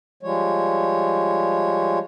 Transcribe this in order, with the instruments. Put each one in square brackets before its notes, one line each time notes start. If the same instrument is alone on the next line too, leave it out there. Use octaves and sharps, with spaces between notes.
[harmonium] F3 G3 G#3 C#5